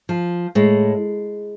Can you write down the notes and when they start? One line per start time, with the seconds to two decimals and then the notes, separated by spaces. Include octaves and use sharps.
0.09 F3
0.55 A2 G#3